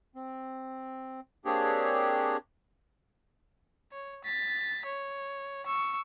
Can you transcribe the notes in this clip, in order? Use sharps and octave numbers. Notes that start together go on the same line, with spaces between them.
C4
A#3 C4 D4 G4 G#4 C#5
C#5
A6 B6
C#5
C#6 E6